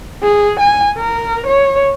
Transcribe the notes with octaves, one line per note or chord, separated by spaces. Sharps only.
G#4
G#5
A#4
C#5